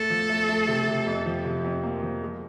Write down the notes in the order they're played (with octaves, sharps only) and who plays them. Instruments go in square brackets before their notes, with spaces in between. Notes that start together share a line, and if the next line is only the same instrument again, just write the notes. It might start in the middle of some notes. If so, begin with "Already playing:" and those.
Already playing: [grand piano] A3 [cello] A4
[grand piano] F3
A3
A3
C3
C3
F2
F3
C3
F2
A#3
F3
G#3